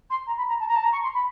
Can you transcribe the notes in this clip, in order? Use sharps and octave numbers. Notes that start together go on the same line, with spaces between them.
C6
A#5
B5
A#5
A5
A#5
A5
A#5
C#6
C6
B5